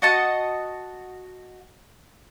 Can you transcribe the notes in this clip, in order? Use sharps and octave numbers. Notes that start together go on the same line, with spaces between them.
F#4 D#5 F#5 A5